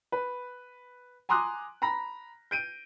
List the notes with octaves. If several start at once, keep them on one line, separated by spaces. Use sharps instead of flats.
B4
G#5 A#5 C6 D6 D#6 F#6
A#5 B5 A#6
G6 D7 D#7